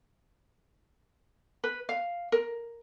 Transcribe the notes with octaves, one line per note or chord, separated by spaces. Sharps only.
B4
F5
A#4